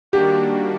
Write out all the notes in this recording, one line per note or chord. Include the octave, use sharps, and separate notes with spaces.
D#3 G3 A#3 D4 F#4 G4